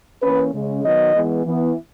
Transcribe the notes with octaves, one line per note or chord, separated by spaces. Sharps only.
E3 A#3 C#4 B4
C#3 G#3 C#4
D#3 F#3 B3 D#5
E3 G#3 B3
E3 B3